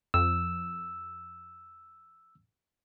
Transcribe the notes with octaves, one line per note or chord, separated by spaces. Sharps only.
F2 E6